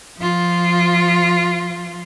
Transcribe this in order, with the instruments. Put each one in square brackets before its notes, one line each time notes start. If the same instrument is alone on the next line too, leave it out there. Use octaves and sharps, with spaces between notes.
[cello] F3 F4